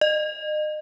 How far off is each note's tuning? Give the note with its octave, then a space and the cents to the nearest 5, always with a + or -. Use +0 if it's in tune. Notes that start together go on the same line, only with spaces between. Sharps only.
D#5 -35